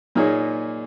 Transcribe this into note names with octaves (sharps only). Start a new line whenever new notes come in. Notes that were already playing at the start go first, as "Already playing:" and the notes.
A#2 A#3 D#4 G#4 C#5